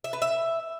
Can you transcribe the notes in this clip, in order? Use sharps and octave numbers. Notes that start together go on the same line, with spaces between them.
E5
B4
E5